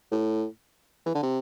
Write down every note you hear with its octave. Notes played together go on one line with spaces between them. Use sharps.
A2
E3
D3
C3